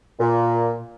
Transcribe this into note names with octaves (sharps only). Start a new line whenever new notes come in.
A#2